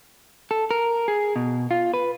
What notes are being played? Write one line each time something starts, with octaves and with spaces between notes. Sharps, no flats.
A4
A#4
G#4
B2
F4
B4